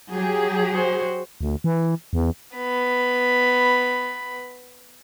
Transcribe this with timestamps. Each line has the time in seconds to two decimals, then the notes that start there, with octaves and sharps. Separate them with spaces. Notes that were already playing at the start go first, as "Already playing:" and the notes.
0.14 F#3 G4 G#4
0.72 F#4 C5
1.41 D2
1.64 E3
2.13 E2
2.57 B3 B5